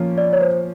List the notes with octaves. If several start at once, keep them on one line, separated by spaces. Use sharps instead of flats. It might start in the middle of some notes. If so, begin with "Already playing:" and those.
Already playing: F3 A#3 C#4 F4
D5
C#5
C5